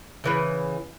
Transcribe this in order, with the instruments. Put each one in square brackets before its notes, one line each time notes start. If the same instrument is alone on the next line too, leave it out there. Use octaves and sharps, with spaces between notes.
[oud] C#3 E3 B4